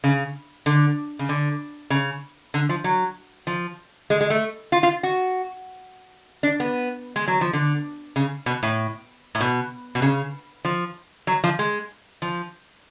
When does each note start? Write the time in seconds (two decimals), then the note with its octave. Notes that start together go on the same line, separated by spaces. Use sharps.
0.04 C#3
0.66 D3
1.19 C#3
1.29 D3
1.90 C#3
2.54 D3
2.69 F3
2.84 F#3
3.47 F3
4.10 G#3
4.21 G#3
4.30 A3
4.72 F4
4.83 F4
5.03 F#4
6.43 D4
6.60 B3
7.16 G#3
7.28 F#3
7.41 F3
7.53 D3
8.16 C#3
8.46 B2
8.63 A2
9.35 A2
9.41 B2
9.95 B2
10.02 C#3
10.65 F3
11.27 F#3
11.44 F3
11.59 G#3
12.22 F3